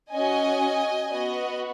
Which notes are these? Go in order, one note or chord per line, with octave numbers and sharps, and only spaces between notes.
C#4 F#4 D#5 G#5
B3 F#4 D#5